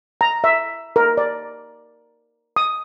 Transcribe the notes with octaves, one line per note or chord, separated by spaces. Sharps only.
A#5
E5
A#4
D5
D#6